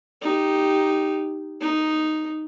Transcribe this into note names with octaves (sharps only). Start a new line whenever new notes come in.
D#4 G4
D#4